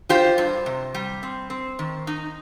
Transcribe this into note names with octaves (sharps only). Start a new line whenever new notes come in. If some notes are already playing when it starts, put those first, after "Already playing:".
F4 G4 C5
G2
C3
G3
C4
C4
D#3
D#4